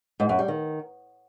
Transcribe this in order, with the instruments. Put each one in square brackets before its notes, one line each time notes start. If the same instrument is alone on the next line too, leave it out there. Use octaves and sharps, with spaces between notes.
[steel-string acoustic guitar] G#2
F#2
G3
D#3